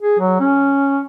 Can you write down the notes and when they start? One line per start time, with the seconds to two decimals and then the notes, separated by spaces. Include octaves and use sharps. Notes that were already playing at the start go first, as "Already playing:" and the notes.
0.01 G#4
0.19 F#3
0.40 C#4